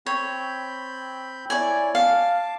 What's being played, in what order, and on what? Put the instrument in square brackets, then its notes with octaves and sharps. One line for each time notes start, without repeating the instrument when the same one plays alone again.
[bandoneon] C4 B5 G6 [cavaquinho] C#5
[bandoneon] E4 C#5 [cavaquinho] D5 G#5
[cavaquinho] F5 [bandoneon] A5 D6